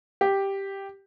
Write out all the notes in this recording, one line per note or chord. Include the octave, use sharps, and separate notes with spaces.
G4